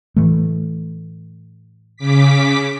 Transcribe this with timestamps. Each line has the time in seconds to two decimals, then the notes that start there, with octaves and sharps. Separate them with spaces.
0.16 A2 E3 A3
1.97 C#3 D6 B6